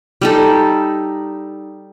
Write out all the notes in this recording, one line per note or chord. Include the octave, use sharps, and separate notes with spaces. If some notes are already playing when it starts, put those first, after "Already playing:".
G3 D#4 A4